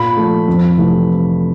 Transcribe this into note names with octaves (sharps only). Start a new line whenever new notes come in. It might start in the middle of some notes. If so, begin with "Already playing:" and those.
Already playing: A#2 B5
F3 A3
F2
C3 E3 A3